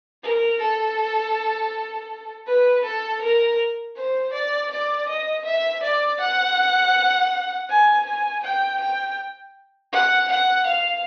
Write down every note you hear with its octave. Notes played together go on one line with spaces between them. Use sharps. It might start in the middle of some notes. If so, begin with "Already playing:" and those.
A#4
A4
B4
A4
A#4
C5
D5
D5
D#5
E5
D5
F#5
G#5
G#5
G5
G5
F#5
F#5
F5